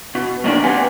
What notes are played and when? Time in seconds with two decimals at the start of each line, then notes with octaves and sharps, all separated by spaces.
0.15 B2
0.44 D#3 F#3 A#3 D4 D#4 D5
0.64 C4 G4 B4 F#5 G#5